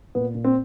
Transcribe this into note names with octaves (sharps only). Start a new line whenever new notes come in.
A#2 B3
A#2
C4